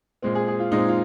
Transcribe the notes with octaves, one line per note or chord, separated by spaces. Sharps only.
A#2 G#3 C4
G#4
G#4
F4
A#2 G#3 C4 D#4
F4